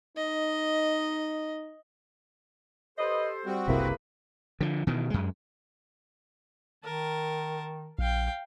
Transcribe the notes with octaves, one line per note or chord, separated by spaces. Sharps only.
D#4 D#5
G4 A4 B4 C5 D#5
G3 C4 F#4
F#1 C2 C3 A#3 E4 G#4 A#4 B4
D3 F3
B2 D#3 E3
F#2 G#3
D#3 A#4 A5
A#1 F5 G5